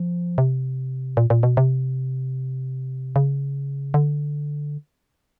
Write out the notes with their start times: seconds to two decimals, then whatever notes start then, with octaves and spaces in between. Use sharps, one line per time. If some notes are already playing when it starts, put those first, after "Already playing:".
Already playing: F3
0.38 C3
1.17 A#2
1.30 A#2
1.43 B2
1.57 C3
3.16 C#3
3.94 D3